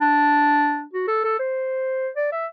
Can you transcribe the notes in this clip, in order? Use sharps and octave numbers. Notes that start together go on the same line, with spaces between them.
D4
F#4
A4
A4
C5
D5
E5